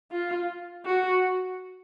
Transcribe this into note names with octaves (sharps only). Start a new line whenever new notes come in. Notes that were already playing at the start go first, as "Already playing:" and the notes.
F4
F#4